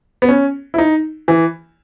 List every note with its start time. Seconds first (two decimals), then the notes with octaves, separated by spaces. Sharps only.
0.22 B3
0.29 C#4
0.74 E4
0.78 D#4
1.28 E3